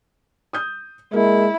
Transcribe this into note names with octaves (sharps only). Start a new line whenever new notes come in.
D#6 G6
G#3 A#3 E4